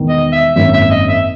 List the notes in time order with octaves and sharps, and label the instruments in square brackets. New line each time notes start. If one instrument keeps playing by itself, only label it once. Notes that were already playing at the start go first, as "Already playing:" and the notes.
Already playing: [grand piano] E1 E2 D#3
[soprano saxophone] D#5
E5
[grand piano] G#1 F#2 D#3 A#3 C#4 [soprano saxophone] E5
[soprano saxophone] E5
D#5
E5